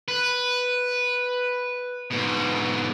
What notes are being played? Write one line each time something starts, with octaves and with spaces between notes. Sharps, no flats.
B4
G#2 B2